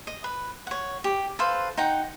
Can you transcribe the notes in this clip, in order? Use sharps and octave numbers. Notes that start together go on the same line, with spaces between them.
D#5
B4
C#5 F#5
G4
A4 B4 C5 F5
D#4 F#5 G5